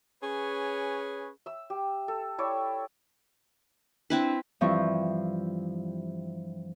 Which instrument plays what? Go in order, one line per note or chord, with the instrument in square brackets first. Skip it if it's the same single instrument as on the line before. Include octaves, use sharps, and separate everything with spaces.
[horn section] C#4 G#4 B4 C#5
[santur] E5 E6
G4
A4
E4 C#5 D5 G5
[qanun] C4 E4 B4 [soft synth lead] D4
[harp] G2 E3 F3 C4 C#6